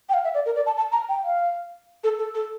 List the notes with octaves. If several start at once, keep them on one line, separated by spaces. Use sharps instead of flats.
G5
F5
E5
D5
A#4
D5
A5
A5
A#5
G5
F5
A4
A4
A4